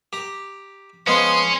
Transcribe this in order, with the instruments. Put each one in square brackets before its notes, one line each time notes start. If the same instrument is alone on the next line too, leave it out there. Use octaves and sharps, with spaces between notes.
[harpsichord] G4 A#5
[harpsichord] F3 G#3 B3 [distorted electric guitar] C#4 [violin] C6